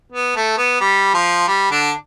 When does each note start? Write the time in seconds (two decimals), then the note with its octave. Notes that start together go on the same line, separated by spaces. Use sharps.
0.12 B3
0.36 A3
0.58 B3
0.80 G3
1.14 F3
1.47 G3
1.71 D3 D4